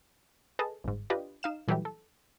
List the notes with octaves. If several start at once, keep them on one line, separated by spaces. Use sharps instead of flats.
G#4 A4 B4 D#5 A5
G1 G#2
D4 F4 G4 B4 D#5
D#4 F5 E7
A#2 E3 F#3 G3 A3 G4
A4